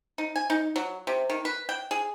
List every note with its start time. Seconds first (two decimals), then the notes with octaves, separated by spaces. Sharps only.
0.18 D#4
0.36 G#5
0.50 D#4
0.76 F#3
1.07 C3
1.30 D#3
1.45 B4
1.69 G5
1.91 G#4